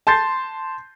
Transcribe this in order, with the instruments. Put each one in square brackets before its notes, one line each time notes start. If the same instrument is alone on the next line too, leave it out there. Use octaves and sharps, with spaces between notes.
[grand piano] A5 C6 G6 A6 C7